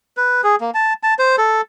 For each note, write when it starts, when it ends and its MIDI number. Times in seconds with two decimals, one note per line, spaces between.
0.17 0.41 71
0.44 0.56 68
0.61 0.71 58
0.74 0.93 81
1.03 1.14 81
1.19 1.36 72
1.38 1.61 69